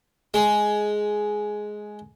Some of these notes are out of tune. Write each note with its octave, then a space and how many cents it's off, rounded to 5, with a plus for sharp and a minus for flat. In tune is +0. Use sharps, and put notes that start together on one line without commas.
G#3 +10